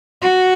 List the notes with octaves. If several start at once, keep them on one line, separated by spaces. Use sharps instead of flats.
F#4